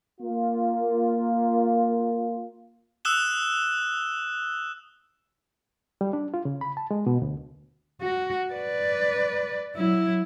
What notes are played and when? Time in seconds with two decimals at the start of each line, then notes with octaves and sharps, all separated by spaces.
0.21 A#3 F4
3.05 D#6 E6 F#6 E7 G7
6.01 G3
6.13 D4
6.34 F4
6.45 C#3
6.61 B5
6.77 A5
6.91 G#3
7.07 B2
7.22 D2
8.02 F#4
8.54 B4 D5
9.76 F#3 E4